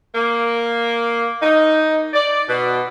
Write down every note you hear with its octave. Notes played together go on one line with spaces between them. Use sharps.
A#3
D#4
D5
B2